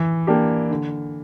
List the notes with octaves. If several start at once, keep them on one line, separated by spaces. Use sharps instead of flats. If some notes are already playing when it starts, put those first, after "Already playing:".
Already playing: E3
A#3 D4 G4
D3